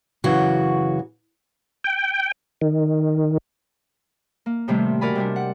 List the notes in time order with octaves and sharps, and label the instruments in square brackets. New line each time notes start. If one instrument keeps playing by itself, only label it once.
[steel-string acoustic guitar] F#2 C#3 E3 F#4
[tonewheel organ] G5
D#3
[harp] A#3
A2 C3 D#3 G3 A3 C4
F#4 A#4 D5 G#5 B5
C3 G3 D4
F#5